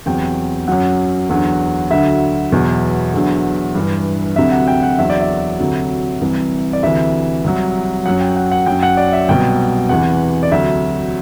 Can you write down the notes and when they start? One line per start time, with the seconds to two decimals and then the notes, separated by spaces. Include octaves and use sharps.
0.06 E2 C3 F#3 G5
0.67 F#2 F#3 F#5
1.29 E2 D3 F#3
1.90 D2 D3 F#3 E5
2.52 E2 B2 F#3
3.14 E2 D3 F#3
3.75 G2 E3
4.36 D2 C3 F#3 E5
4.52 F#5
4.68 G5
4.83 F#5
4.99 E2 D3 F#3 E5
5.10 D5
5.21 E5
5.60 D2 C3 F#3
6.21 C2 C3 E3
6.73 D5
6.83 D2 C3 E3 E5
7.44 C2 C3 F#3
8.06 F#2 F#3 F#5
8.21 G5
8.36 F#5
8.52 F#5
8.66 F#2 F#3 G5
8.83 F#5
8.97 D5
9.13 E5
9.28 C2 B2 F#3 G5
9.89 E2 C3 E3 F#5
10.43 D5
10.51 D2 C3 F#3 E5